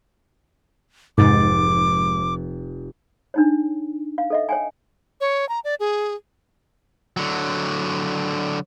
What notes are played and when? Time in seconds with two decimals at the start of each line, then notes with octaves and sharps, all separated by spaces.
1.18 F1 G#2 D6 A6
3.34 D4 D#4 C#5
4.18 F5
4.30 A4 D#5 E5
4.49 C#5 G5 G#5
5.21 C#5
5.49 A#5
5.64 D5
5.80 G#4
7.17 D3 F#3